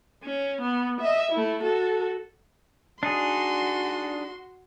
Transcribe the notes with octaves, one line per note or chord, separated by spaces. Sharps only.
C#4
B3
D#5 E5
A3 E4
F#4 A4
D4 D#4 F#4 G#4 C6